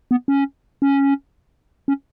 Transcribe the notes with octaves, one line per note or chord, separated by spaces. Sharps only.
B3
C#4
C#4
C#4